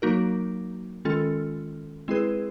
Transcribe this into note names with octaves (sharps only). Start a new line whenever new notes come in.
F#3 A#3 D#4 F#4 A#4
D#3 G#3 C#4 F4 A4
G#3 C4 E4 G#4 B4